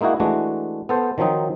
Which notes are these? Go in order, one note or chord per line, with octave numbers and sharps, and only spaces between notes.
G#3 A#3 D#4 E4 F#4
E3 G#3 A3 D4 F#4
B3 A4 C5
D#3 F3 F#3 C4 D#4